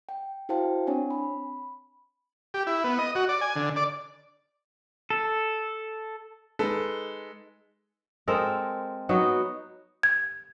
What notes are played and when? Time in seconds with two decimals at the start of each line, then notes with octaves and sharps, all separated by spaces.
0.09 G5
0.49 E4 F#4 C5 F5 G5 A5
0.87 C4 D4 C#5 G#5
1.11 B5
2.54 G4
2.67 E4
2.84 B3
2.99 D#5
3.15 F#4
3.29 D5
3.41 G#5
3.56 D3
3.76 D5
5.10 A4
6.59 G#3 D#4 A4 B4
8.28 G#3 C4 A4 A#4
9.09 F#3 B3 D#4 F#4
10.03 G#6